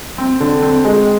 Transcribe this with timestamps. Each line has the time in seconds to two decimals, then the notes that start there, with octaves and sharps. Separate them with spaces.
0.18 C4
0.40 D3
0.63 C4
0.84 G#3